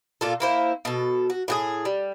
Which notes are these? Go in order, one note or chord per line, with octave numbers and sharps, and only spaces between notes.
A#2 F4 A4
A#3 E4 C5
B2 A4
F#4
A2 F#4 G#4
G3